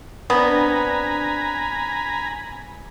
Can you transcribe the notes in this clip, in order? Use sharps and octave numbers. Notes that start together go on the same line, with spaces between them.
B3 C4 D4 G#5 A#5 B5